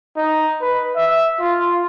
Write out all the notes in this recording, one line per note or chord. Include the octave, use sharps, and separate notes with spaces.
D#4
B4
E5
F4